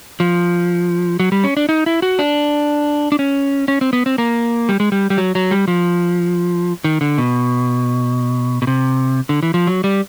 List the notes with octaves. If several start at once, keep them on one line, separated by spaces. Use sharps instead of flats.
F3
F#3
G3
C#4
D4
D#4
E4
F#4
D4
D4
C#4
C#4
C4
B3
C4
A#3
G3
G#3
G3
G3
F#3
F#3
G3
F3
D#3
D3
B2
B2
C3
D3
E3
F3
F#3
G3